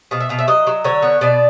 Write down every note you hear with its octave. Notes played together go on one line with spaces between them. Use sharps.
B2 F5
E5
B2 F5
E5
F#3 D#5
F#3
D3 C#5
B3
B2 D5